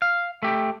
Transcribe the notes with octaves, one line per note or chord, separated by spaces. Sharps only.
F5
A3 G4